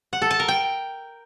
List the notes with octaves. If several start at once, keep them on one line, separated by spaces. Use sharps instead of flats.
F#5
A4
A5
A#4
G5